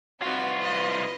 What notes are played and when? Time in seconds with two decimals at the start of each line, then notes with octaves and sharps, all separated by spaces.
0.22 C2 C4 F4 F#4 B4
0.57 B4 D#5